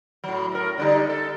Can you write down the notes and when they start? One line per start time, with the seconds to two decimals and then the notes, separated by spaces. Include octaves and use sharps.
0.24 A2 F#3
0.52 A2 A#4
0.78 D3 G3 D#4
1.09 A4